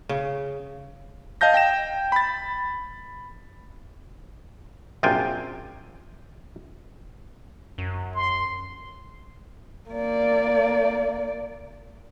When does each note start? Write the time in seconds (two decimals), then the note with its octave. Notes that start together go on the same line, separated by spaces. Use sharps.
0.09 C#3
1.41 D#5 F5 A5 G6 A#6
1.54 G5 A#6 E7
2.12 B5 A6
5.03 A#1 F#2 C3 F4 G5 G#5
7.78 F#2
8.14 C6
9.90 A#3 D5